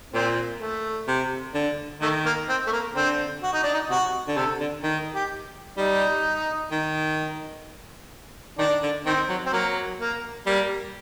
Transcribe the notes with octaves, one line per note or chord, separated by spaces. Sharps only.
A#2 C4
A3
C3
D3
D#3 A3
A#3
C4
A3
A#3
D3 C4
F#4
D#4
D4
D#4
C3 F#4
D3
C3 A4
D3
D#3
G4
G3 D#4
D#3
D#3 D4
D3
D#3 C4
F#3
C4
F#3 A#3
A#3
G3 A#3